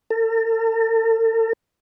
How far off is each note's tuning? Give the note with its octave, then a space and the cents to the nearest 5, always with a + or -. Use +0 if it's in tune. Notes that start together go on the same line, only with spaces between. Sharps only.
A4 +45